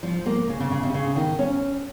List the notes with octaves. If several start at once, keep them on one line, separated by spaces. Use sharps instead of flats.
F3
A#3
C#3
C#3
C#3
C3
C#3
D#3
C#4